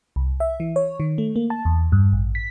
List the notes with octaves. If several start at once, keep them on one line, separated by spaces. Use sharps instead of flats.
C2
E5
E3
C#5
D#3
A3
A#3
A5
E2
G2
A1
B6